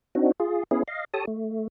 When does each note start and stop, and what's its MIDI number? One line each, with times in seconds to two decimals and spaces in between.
0.15 0.32 60
0.15 0.32 62
0.15 0.32 63
0.15 0.32 66
0.40 0.63 65
0.40 0.63 68
0.71 0.83 59
0.71 0.83 61
0.71 0.83 64
0.71 0.83 68
0.88 1.05 75
0.88 1.05 77
1.14 1.25 67
1.14 1.25 69
1.14 1.25 73
1.14 1.25 81
1.14 1.25 87
1.27 1.68 57